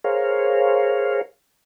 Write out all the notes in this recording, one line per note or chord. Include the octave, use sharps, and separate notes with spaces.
G#4 A#4 C5 C#5 F5